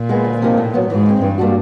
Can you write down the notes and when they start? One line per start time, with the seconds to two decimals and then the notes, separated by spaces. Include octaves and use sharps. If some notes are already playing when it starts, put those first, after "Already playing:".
Already playing: A#2
0.09 G#3 B3
0.24 D2
0.42 C3 F3 A#3 D#4
0.58 A2
0.74 F#3 B3
0.90 G#2 E3
1.06 G#3 C4
1.21 G2 E3
1.38 G3 A#3 D4 F#4